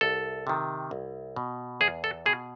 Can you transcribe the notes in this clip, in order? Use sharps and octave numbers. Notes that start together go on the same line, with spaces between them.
C2 A4
C3 D#3
C2
B2
E2 G#4
A4
B2 G#4